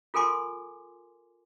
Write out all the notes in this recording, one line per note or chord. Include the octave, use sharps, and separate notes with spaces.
F4 A4 A#4 G#5 C6 D6